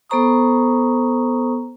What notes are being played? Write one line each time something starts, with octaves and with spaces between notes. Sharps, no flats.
B3 A4 C5 A#5 C#6 D#6